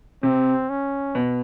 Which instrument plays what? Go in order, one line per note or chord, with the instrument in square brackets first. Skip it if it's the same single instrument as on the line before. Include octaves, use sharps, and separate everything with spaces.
[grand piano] C3 [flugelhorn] C4
[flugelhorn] C#4
[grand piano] B2